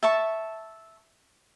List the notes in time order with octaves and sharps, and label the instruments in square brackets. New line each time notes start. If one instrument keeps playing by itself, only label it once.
[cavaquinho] E5 A5 C#6